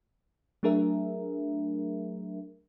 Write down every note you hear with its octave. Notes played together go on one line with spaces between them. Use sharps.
F#3 A3 D4 G#4 A#4 E5